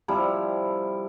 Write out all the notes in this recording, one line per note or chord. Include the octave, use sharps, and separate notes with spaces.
C3 F3 G3 E4